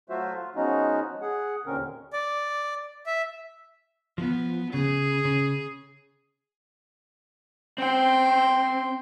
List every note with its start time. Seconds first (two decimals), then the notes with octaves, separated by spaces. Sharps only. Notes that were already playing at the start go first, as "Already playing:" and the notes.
0.10 F#3 A3 F4 F#4 C5 E5
0.35 F4
0.56 F3 G#3 B3 C#4 D#4 F#4
1.22 G#4 F#5
1.66 D#2 A#2 D3 C4 C#4 A#4
2.13 D5
3.06 E5
4.18 F3 B3
4.74 C#3 G#4
5.25 C#3
7.78 C4 G5 C6